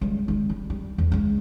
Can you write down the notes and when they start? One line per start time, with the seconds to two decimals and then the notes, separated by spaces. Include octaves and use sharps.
0.01 C#2 G3
0.28 C#3 G#3
0.49 G3
0.70 G3
0.98 E2
1.12 C#3 G#3